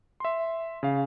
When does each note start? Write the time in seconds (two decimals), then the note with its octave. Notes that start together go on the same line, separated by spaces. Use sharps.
0.20 E5 C6
0.83 C#3 F5